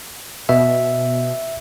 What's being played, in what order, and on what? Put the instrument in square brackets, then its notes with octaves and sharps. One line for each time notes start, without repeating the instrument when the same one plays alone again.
[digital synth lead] B2 [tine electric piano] E5